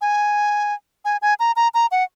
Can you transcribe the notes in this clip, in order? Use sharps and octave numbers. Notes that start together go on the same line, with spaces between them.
G#5
G#5
G#5
A#5
A#5
A#5
F#5